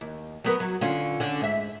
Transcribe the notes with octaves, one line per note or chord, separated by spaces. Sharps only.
D#2
F#3 B3 A#4
F#3
D3 C#4 F4
D3 C#4
G#2 E5